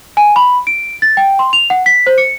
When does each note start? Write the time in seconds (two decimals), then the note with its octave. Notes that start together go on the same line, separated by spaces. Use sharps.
0.17 G#5
0.36 B5
0.67 D7
1.02 A6
1.17 G5
1.39 C6
1.53 F7
1.70 F#5
1.86 B6
2.07 C5
2.18 C#7